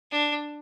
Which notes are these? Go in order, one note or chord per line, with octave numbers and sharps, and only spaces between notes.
D4